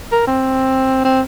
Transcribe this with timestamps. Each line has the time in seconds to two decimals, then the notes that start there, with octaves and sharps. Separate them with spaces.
0.12 A#4
0.27 C4
1.05 C4